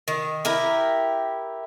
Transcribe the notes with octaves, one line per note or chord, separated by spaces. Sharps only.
D#3
E4 G4 A#4